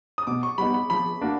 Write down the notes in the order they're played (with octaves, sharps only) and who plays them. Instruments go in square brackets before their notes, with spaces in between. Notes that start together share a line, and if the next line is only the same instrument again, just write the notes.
[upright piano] D#6
[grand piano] B2 [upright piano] D6
[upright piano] C#6
[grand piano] G3 B3 D#4 [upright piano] B5
[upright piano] B5
[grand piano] F3 [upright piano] B5
[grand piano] A#3 D4 F#4